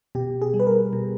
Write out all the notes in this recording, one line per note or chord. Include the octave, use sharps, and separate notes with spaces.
B2 G4
G#4
G3
B4
A#4
B2